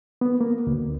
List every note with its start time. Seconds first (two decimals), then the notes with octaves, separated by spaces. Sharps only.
0.21 B3
0.41 A#3
0.67 D2